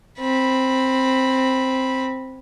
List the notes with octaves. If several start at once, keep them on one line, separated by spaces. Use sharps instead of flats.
C4 B5